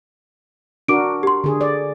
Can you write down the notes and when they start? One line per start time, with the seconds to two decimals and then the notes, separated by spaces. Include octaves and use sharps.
0.88 D4 F#4 A#4 D6 D7
1.23 G4 C6
1.44 D3 G#4
1.61 D5